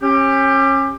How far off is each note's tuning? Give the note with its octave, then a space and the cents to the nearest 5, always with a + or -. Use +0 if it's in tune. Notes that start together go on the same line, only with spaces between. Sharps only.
C#4 -30 G4 +15